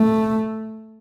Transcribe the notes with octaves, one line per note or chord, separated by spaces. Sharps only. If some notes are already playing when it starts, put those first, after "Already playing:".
Already playing: A3